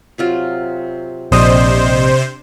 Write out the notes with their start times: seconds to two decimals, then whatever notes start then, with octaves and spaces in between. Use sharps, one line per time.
0.18 C3 F#3 F4
1.32 A#1 C3 D4 C5 D#5